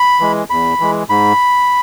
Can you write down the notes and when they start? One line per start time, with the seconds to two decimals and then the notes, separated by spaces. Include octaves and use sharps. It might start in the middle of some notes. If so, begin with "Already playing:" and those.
Already playing: B5
0.20 E3 G#3
0.50 E2 B5
0.80 E3 G#3
1.09 G#2 B5